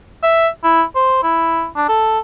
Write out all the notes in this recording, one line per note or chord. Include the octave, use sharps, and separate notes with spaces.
E5
E4
C5
E4
D4
A4